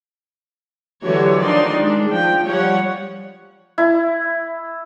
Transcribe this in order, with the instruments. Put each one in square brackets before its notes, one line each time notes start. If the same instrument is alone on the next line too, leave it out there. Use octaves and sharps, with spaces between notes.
[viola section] D3 E3 F#3 F#4 G4 C#5
D#3 F3 D4 D#4 D5 C6
G#3 D4
F3 G5
F3 G3 C#5 F#5
[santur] E4